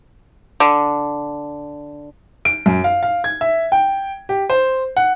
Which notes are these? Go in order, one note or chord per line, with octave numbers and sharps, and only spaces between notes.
D3
D7
F#2
F5
F5
G#6
E5
G5
G4
C5
F#5